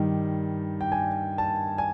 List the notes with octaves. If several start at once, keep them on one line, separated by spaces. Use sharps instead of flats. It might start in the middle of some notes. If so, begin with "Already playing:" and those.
Already playing: G2 D#3 G3
G5
G#5
A5
G#5